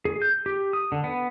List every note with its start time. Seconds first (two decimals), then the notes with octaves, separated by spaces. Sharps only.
0.05 G#4
0.22 G6
0.46 G4
0.73 D#6
0.92 D3
1.04 B3